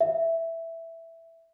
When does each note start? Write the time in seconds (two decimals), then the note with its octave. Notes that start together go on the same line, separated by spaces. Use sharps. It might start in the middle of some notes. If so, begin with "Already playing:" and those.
0.01 E5